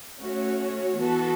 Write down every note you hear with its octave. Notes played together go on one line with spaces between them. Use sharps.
A3 C#4 F#4 C#5
E3 B3 F#4 A4